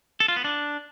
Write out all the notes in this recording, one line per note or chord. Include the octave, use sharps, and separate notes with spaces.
A4
F4
B3
D4